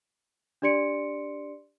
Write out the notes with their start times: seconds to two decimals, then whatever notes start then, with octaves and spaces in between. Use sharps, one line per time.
0.62 D4 G4 D5 C6 C#7 D7